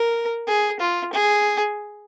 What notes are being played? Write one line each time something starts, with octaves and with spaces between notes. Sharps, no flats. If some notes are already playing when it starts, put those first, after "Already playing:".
Already playing: A#4
G#4
F4
G#4